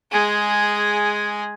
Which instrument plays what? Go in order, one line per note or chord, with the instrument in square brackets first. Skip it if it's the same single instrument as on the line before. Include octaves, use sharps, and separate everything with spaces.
[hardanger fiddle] G#3 G#4